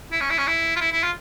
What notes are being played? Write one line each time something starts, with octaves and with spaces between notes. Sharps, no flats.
E4
C#4
E4
C#4
E4
F4
E4
E4
F4